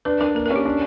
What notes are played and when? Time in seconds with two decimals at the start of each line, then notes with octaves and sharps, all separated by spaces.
0.05 D4 B4
0.21 D4 A#4
0.35 A#3 A#4
0.46 A#4
0.51 C#4
0.56 G4
0.65 D4